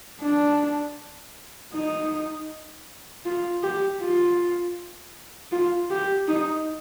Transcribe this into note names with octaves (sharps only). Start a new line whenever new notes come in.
D4
D#4
F4
G4
F4
F4
G4
D#4